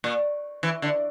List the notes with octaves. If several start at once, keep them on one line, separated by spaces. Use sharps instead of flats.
A#2
E3
D3